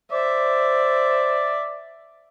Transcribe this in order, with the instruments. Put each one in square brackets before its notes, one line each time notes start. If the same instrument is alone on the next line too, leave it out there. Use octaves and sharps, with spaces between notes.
[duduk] C5 [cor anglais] D5 [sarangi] E5